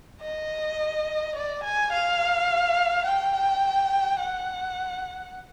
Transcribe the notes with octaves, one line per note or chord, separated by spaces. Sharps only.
D#5
D5
G#5
F5
G5
F#5